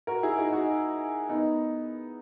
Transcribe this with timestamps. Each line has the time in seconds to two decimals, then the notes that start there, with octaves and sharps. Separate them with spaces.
0.07 F#4 A#4
0.23 E4 G#4
0.38 D#4 F#4
0.53 D#4 F#4
1.29 B3 D#4